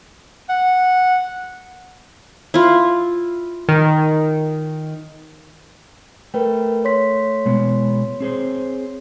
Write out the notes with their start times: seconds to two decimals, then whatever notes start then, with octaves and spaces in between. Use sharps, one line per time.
0.49 F#5
2.54 E4 F4
3.69 D#3
6.34 A3 A#4 B4 G5
6.85 C#5 C6 B6
7.45 B2 G#3 B3
8.20 C4 G#4 C5